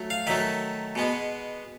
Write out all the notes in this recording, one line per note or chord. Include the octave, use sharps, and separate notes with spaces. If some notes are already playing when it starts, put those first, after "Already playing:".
Already playing: F#3 A3
F5
D#3 F#3 A3 E5
B2 G#3 B3